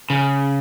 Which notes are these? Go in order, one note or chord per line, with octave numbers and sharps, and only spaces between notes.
C#3